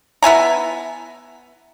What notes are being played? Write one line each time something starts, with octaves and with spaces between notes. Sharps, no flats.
B3 E4 G#5 A#5